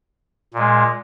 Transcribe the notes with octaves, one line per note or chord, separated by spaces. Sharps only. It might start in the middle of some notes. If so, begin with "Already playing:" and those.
A#2 G#3